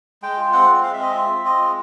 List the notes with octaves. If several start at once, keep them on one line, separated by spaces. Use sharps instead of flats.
G#3 G5
F4
C4 F#5
G#3
G#3 F5
E5
C4 D#5
F4 E5
C4
F4 D#5
G#3